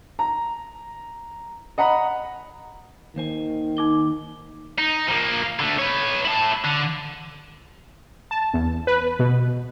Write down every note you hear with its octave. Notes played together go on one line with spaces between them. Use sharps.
A#5
D#5 F#5 A#5 B5
D#2 D#3 C5 G#5
D#4 D6 G7
D#4
F3 A#3
D3 A3
B4 C#5
E4 A5
D3
A5
E2
B4
B2